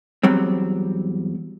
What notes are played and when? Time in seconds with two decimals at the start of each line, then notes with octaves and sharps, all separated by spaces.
0.23 E2 F#3 G3 C4